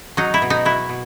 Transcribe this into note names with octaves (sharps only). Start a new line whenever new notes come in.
F#3 D#4
E4
B2
D#4
F#3 E4
B2